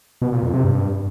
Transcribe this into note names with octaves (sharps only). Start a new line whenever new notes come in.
B2
A#2
F2
C3
G2